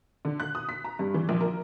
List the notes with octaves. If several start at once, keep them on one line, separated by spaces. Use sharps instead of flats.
D3
F#6
D#6
B6
A#5
G2
E3
A#1
A#4